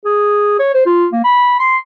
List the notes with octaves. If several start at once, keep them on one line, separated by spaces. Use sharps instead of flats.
G#4
C#5
C5
F4
A#3
B5
C6